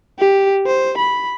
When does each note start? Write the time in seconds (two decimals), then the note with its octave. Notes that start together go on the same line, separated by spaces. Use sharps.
0.19 G4
0.67 C5
0.98 B5